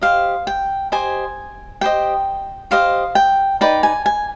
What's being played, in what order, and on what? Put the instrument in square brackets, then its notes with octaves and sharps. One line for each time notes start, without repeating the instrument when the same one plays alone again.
[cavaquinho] G4 C5 D#5 F5
G5
G4 C5 D#5 G#5
G4 C5 D#5 G5
G4 C5 D#5 F5
G5
D#4 B4 D5 G5
G#5
G#5